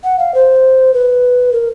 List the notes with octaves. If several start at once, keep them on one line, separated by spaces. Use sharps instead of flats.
F#5
F5
C5
B4
A#4